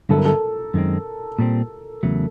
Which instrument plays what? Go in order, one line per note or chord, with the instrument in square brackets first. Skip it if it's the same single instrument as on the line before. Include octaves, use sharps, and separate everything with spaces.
[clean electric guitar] G2 D3 F#3 B3 E4 [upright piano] A4
[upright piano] A#4
A4
[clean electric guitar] F#2 D#3 G#3 C4
A#2 G3 C4
E2 C#3 F#3 A3